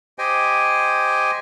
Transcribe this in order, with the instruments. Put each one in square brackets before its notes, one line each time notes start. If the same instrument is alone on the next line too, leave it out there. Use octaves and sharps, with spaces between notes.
[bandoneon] G4 C5 D#5 G5 G#5